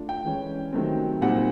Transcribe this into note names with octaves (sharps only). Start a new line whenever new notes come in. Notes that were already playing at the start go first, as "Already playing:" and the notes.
Already playing: A3 D4 F4
G5
E3 G#3 C#4
C3 D#3 F#3 A3 C4
A#2 G3 C4 D#4 F#5